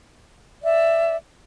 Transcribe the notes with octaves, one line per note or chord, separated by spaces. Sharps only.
D5 E5